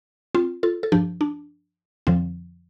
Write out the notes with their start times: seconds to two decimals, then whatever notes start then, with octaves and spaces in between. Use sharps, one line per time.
0.35 C4 F4
0.63 F4 A4
0.83 A4
0.92 G2 F3 D4 G4
1.21 D4
2.07 F2 D3 F3 C4